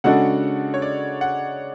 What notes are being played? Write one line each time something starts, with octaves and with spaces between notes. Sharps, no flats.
C#3 G#3 D4 F#4 A4 F#5
C#5
D5
F#5